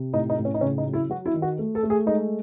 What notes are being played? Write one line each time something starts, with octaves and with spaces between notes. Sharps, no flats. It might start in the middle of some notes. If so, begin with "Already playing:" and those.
Already playing: C3
A2 D#4
D#4
A2
C#4
D#4
C#3 C#4
D#4
F#3
E4
F#3 F#4
E4
D#3
F#4
A3
A4
A3
G#4
G#3 D#4